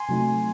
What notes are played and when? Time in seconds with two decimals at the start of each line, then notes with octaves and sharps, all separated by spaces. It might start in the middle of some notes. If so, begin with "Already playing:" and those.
Already playing: G#5 C6
0.09 C3 F#3 A3 D#4